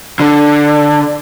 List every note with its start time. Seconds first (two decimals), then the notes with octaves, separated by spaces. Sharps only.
0.20 D3